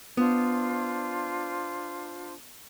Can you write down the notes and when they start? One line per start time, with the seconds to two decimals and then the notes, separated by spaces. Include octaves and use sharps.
0.17 B3 D4 F4 C5